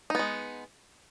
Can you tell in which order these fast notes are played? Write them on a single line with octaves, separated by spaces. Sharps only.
D#4 B3 G#3